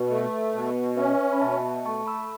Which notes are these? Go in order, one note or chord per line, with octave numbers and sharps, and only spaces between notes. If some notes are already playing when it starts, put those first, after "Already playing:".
Already playing: B2 B4
A3
B2
C#4 B4 E5
B5
B2 E5 A5
A3 A5 C#6
B5 E6